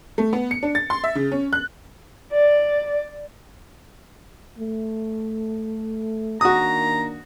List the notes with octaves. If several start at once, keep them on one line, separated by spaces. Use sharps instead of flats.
A3
B3
C#7
D4
A6
C6
E5
C#3
C#4
F#6
D5
A3
D#3 A#3 D4 F#4 A#5 D#6